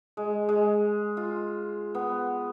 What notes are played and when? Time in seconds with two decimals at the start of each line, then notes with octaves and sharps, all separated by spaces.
0.17 G#3
0.49 G#3
1.17 F4
1.95 B3